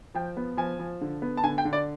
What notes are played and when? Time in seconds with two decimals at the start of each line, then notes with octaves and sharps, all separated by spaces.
0.14 F3 G5
0.37 B3
0.57 F3 G#5
0.79 F3
1.01 D3
1.22 B3
1.37 A5
1.44 D3 G#5
1.58 G5
1.65 D3
1.73 D5